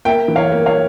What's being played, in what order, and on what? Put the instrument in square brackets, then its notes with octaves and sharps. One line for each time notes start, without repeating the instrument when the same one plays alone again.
[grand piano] A#3 E5 G5
E3
C#5 F5
A#3
C#5 F5